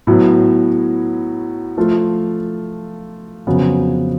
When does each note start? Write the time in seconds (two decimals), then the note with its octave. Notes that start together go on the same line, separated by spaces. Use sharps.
0.07 A2 F#3 B3
1.77 F3 A3 F4
3.47 F2 C#3 F#3 B3